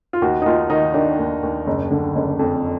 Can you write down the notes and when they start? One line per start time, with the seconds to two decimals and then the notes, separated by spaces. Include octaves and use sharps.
0.13 F4
0.22 D#2 F#4
0.42 D#4
0.46 D#2 F4
0.70 D#3 D#4
0.94 D#3 D4
1.19 D#2
1.43 D#2
1.67 F#1
1.91 D3
2.15 F#1
2.39 F2